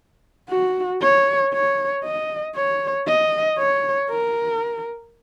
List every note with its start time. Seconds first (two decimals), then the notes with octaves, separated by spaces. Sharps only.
0.50 F#4
1.02 C#5
1.53 C#5
2.04 D#5
2.55 C#5
3.07 D#5
3.58 C#5
4.10 A#4